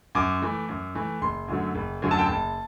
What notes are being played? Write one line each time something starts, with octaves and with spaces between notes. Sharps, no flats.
F#2 D6
E3 A3
F#2
E3 A3
F#1 C6
F#2 D3 F#3 A3
F#1
F#2 D3 F#3 A3
A5
G5
F#1 A5